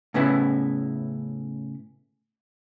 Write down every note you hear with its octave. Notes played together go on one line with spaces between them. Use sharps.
A2 C#3 B3 E4